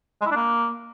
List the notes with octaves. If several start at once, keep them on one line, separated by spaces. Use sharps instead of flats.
G#3
E4
D4
A#3